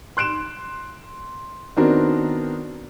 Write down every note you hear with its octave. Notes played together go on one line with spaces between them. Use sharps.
C6 F#6 D7 E7
D#3 B3 C4 D4 F#4 A#4